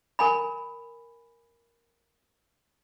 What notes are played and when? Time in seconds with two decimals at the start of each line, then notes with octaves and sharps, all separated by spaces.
0.19 A#4 G#5 B5